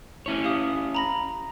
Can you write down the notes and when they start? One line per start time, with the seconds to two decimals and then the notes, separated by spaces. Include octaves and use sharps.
0.26 C#4 E4 C#5
0.43 G4 F5 D#6
0.95 A#5 B5 A#6